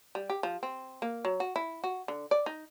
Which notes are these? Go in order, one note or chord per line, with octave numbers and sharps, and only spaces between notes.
G3
G4
F3
C4
A#3
F#3
F#4
E4
F#4
D3
D5
D#4